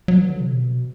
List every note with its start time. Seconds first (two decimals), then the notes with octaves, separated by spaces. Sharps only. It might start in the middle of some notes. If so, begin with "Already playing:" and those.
0.08 F#3
0.18 E3
0.29 D3
0.40 C3
0.50 B2